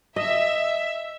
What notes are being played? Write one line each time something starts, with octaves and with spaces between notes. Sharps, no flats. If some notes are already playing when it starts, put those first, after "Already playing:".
D#5 E5